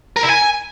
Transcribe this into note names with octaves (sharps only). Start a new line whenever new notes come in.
A#4
E4
G#5